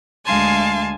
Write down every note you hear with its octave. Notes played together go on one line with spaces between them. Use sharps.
D2 G#3 F5 G#5 A5 C6